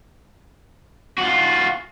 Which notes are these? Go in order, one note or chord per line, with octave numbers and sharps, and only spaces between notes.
F4 F#4